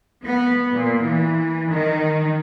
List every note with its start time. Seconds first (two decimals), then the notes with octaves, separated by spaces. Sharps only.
0.24 B3
0.75 A#2
1.05 E3
1.72 D#3